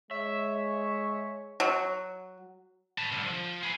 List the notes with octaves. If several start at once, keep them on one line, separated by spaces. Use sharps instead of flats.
G#3 C#5 E5
F#3
B4 A5
C2 D3
F3
G#4 B4